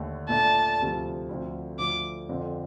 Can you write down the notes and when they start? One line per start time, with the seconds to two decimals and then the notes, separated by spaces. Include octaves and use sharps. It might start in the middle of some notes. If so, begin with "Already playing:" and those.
Already playing: D#2 D3 A3
0.29 A#2 A3 D4 A5
0.79 D2 C3 F3
1.29 D2 D3 F3 C4
1.79 D2 D3 F3 D6
2.29 F2 D3 F3 C4